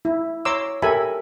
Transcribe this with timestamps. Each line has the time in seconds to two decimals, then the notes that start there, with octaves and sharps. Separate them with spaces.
0.05 E4
0.45 C#5 A#5 C6 D6 E6
0.82 G4 A4 A#4 E5 G#5 B5